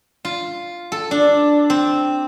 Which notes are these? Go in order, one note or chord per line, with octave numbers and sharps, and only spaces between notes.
F4
A4
D4
C4